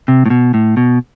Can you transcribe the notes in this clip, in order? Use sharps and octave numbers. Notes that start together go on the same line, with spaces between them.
C3
A2
B2
A2
B2